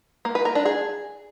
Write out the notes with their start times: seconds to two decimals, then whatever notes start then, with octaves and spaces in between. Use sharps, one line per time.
0.25 A#3
0.35 B4
0.45 A#4
0.55 D4
0.65 G#4